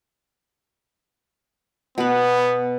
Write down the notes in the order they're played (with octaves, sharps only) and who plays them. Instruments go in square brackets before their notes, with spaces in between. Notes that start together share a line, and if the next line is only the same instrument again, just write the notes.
[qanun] B2 B4 [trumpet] B3